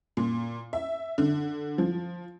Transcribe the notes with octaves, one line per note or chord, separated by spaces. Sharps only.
A#2
E5
D3
F3